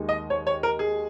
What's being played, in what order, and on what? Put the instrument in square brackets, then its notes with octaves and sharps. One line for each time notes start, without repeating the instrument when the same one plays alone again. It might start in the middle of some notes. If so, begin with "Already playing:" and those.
Already playing: [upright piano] D#2 D#3 G#3 D#4
[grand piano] D#5
C#5
C#5
A#4
G#4